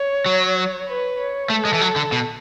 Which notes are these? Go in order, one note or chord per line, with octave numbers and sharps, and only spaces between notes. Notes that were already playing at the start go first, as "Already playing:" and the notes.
Already playing: C#5
F#3
B4
C#5
A3 A4
G#3
E3
F#3
D3
B2